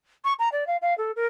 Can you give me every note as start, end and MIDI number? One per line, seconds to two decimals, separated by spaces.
0.25 0.34 85
0.39 0.49 82
0.52 0.67 74
0.67 0.77 77
0.82 0.96 77
0.98 1.12 69
1.16 1.27 70